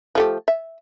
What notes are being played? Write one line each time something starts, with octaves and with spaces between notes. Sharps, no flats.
F3 A3 G4
E5